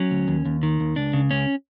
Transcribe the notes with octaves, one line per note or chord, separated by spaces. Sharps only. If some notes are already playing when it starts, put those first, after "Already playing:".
Already playing: F#3 C#4
D2
D#2
D#2
D#3
D#2
C#2 D4
C#3
C#2 C#4